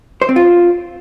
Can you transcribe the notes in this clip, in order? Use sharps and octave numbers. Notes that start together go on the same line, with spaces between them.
C5
C4
F4